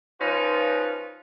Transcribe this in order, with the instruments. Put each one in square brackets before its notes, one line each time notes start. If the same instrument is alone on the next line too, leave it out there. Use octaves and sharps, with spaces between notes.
[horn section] F3 C#4 D#4 F4 B4